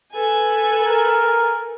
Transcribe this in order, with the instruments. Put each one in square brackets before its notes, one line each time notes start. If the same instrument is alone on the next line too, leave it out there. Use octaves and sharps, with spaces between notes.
[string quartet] A4 B4 G#5
[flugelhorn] A#4